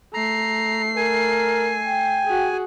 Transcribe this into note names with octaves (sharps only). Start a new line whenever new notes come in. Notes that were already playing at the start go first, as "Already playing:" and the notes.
A3 A#5 C7
A#4 G#5
G5
F#4 G#4